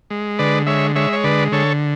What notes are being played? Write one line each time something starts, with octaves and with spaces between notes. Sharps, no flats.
G#3
D3 B4 D5
G#3 C#5 E5
G#3 C#5 E5
C#5
D3 B4 D5
D3 A4 C#5